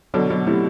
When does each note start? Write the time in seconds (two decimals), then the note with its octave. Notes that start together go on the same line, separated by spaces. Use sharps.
0.14 B2 D3 F#3
0.30 B2 F#3
0.46 A2 C3 E4